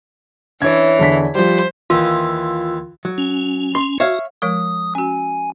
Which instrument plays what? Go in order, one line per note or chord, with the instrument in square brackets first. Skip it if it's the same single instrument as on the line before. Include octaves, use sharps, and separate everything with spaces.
[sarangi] E3 [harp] D4 C#5 D5 [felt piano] G#6
[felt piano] E2 D3 B6
[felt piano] F3 G3 [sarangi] C5
[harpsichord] D#2 E3 D#6 [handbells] F4
[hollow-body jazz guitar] F#3
[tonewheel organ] C#4
[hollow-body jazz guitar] C6
[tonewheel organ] F#4 [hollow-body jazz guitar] C#5 E5 F5
[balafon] F3 G#3 A#4 [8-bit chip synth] D#6
[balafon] C#4 F#4 [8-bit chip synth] G#5